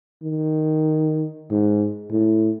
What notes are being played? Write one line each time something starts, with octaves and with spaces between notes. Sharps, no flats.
D#3
G#2
A2